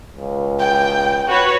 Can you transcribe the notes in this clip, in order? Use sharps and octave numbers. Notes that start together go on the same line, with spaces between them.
C#2
G5
F#4 B4 C#5